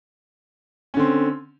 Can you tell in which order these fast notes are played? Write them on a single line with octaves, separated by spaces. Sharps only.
C#4 D3 C4